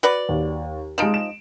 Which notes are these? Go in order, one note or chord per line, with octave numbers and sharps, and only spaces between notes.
F#4 B4 D5
D#2
F3 G#3 D#4 D7 E7
E7